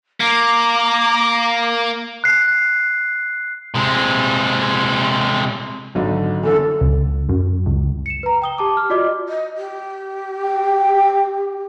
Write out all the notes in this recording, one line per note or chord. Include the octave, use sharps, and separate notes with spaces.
A#3 A#5 D6
F#6 C7
C3 G#3
G#1 D3 F#3 D#4
F#2 D3 E3 A4
C#2
F#2
C#2
C#7 E7
B4 A#5
G5 D#6 G7
G4 A5 D6
F6
F4 F#4 D5 D#5 D6
D#5
G4
G5